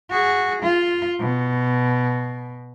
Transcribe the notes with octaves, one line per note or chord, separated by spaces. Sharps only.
F#4 G#4
F4
B2